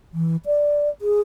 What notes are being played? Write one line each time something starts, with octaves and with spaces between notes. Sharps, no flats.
E3
D5
G#4